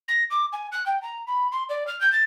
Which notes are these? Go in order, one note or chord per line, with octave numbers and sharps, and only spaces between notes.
A#6
D6
G#5
F#6
G5
A#5
B5
C6
D5
F6
G6
A6